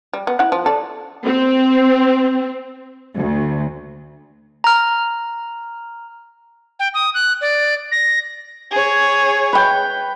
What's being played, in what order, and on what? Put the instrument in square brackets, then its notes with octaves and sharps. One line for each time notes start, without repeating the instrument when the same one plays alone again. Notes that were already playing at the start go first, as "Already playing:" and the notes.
[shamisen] G3
B3
E4 F#5
F3
A4 D5
[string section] C4
D2
[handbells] A#5 F6
[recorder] G5
D#6
F#6
D5
A#6
[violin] G#4 C#5
[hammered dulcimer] B4 G5